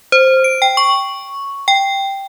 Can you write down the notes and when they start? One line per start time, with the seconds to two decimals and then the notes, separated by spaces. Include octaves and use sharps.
0.12 C5
0.44 D7
0.62 G5
0.77 C#6
1.68 G5